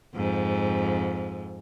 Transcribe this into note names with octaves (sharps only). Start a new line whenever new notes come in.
F2 G#2